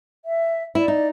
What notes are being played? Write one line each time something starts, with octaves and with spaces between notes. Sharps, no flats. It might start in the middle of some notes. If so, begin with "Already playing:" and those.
E5
E4 D5
D#4